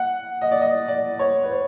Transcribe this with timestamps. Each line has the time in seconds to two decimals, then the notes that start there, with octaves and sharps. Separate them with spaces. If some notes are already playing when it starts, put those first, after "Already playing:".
Already playing: F#5
0.41 D#5
0.51 D5
0.61 D#5
0.88 D5
1.19 C#5
1.43 B4
1.51 C5